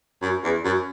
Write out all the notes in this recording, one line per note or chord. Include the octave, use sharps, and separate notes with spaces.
F#2
E2
F#2